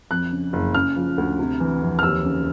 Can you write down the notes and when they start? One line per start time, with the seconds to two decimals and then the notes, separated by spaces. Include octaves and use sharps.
0.11 F2 F#6
0.32 C#3
0.53 F#1
0.75 C#3 F6
0.96 F3
1.18 D2
1.39 C3
1.60 E3
1.82 F2
1.99 F6
2.03 D#2 E6
2.25 C#3